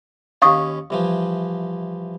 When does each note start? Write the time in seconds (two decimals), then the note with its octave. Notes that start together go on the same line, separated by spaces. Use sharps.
0.42 D#2 C#4 F5 C#6 D#6
0.90 C2 E3 F3